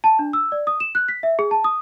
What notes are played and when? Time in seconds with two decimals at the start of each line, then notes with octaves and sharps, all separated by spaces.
0.04 A5
0.19 D4
0.33 E6
0.52 D5
0.67 D#6
0.80 E7
0.95 F#6
1.08 B6
1.23 E5
1.39 G#4
1.51 A5
1.64 D#6